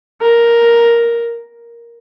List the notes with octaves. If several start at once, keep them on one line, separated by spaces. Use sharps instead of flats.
A#4